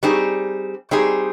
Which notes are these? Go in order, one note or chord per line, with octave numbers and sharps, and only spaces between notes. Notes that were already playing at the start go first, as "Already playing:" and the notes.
G3 C4 D#4 G#4
G3 C4 D#4 G#4